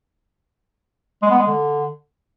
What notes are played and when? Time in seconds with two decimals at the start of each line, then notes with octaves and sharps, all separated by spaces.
1.22 G#3
1.31 B3
1.39 G#3
1.47 D3